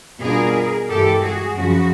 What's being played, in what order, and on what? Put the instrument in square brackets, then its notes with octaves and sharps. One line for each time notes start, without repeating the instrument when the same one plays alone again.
[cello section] B2 G3 B3 D4 F4 G#4 A#4
G2 E3 G#3 G4 A4
F#4 G#4
F#2 C#3 F3 F#4